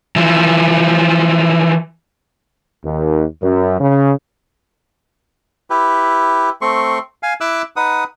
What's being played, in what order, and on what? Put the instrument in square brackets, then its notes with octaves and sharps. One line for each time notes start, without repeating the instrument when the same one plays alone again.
[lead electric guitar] E3 F3
[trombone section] D#2
F#2
C#3
[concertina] E4 G4 B4
A3 C4 C6 C#6
F5 G#5
E4 E5 D6 E6 F#6
D#4 B4 F#5 D#6